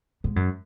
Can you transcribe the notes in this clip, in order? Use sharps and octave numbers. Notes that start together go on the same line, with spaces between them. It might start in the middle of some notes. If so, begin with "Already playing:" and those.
G#2
F#2